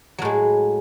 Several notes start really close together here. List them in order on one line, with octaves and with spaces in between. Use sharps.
F#3 A2 G#3